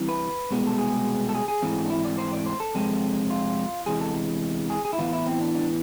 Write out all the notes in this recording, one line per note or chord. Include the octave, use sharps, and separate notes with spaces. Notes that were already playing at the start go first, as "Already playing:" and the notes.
Already playing: C2 C3 E3
B4
C2 B2 G#3 B3
A4
G#4
A4
G#4
G#4
G#2 E3 A3 C4
D4
E4
D5
C5
D5
C5
A4
F2 C3 G#3 C4
F4
E2 C3 E3 G#3 G#4
A4
G#4
G#4
E4
A2 E3 B3 F4
E4
C4
D4
D4